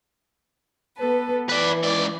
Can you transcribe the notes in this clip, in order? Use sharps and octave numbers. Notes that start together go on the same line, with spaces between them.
B3 A4 B4
E3 B4 D5
C#2 D5